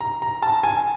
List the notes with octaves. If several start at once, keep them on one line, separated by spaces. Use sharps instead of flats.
A#5
A#5
A5
G#5